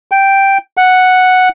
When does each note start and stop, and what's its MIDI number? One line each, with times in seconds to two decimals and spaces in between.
0.12 0.58 79
0.77 1.49 78